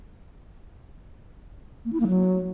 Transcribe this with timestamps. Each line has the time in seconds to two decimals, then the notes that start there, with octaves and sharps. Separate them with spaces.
1.85 A#3
1.93 E4
2.00 A#3
2.08 F#3